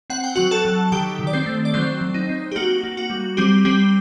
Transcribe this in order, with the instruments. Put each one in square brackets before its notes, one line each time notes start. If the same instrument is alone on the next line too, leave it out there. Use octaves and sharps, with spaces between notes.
[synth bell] C4 F#5
G5
F#3 F#4 F#5
A4 A5
F#3
D#3 G4 G5
D#3
D5
C4 C5
A3
D5
F#3 C4 C5
F#3
D#4
C4
G4
A#3 F#4
A#3
F#4
G3
G3 C4 G4
G3 C4 G4